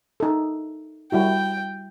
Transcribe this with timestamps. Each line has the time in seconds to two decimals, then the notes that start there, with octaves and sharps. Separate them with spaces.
0.20 D#4 A4
1.12 G3 E4 F#4 G5